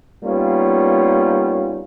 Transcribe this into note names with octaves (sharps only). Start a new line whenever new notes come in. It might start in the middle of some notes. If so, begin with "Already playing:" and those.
G3 A#3 B3 C#4 D#4 F4